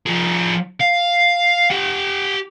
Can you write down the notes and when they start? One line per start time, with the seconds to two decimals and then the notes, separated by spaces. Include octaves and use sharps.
0.07 F3 G#4
0.81 F5
1.70 G4 F#5